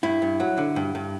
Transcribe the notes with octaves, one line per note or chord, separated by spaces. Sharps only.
G2 E4
G2
F#3
D3
G2
G2